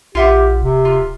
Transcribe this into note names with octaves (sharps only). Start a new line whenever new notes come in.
A#1 F4 G4 E5 F#5
D1 C3
F4